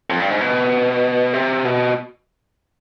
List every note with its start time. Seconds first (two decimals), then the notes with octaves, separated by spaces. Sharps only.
0.10 F2
0.20 G2
0.30 G#2
0.41 B2
1.34 C3
1.65 B2